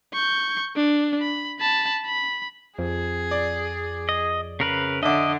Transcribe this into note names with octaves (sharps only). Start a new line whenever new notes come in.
C#6 G6
D4
B5
A5 B5
B5
F2 G#4
D5
D#5
C#3 A#4 B4
D3 D#5 E5 D6